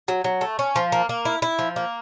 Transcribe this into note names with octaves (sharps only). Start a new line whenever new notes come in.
F#3
F#3
A3
C#4
F3
A#3
A#3
E4
E4
F3
A#3